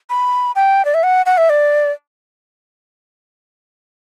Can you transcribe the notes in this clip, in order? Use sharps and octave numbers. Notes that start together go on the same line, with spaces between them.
B5
G5
D5
E5
F#5
F#5
E5
D5